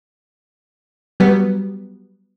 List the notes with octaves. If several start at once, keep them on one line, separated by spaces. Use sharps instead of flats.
F#3 G3 B3